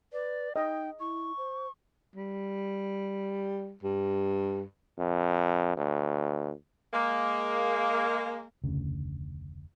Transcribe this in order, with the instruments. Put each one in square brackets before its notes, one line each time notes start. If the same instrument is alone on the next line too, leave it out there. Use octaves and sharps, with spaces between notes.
[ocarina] B4 [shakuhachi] D5
[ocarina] D#4 [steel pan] D#5 [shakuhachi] G5
[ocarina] E4 [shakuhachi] C#6
[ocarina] C5
[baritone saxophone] G3
G2
[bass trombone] F2
D2
[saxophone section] G#3 A#3
[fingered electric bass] F1 D2 C#3